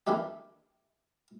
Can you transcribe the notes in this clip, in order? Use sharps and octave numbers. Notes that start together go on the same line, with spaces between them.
D#3 E3 A#3 D4 D#4 G4